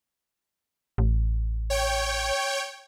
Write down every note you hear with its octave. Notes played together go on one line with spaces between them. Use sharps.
A1
C#5 G5